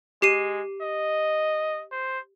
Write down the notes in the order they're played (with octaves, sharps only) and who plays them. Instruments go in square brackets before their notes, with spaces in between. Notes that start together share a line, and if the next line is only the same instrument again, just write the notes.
[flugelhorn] G#3 [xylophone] G4 C7 D#7
[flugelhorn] D#5
C5